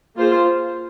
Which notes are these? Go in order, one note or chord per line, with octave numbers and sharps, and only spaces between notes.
A#3 F4 G#4 C5